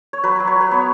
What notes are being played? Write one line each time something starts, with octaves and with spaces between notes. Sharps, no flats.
C#5
F#3 B4
F#3
C#5
F#3 B4
B3 C#5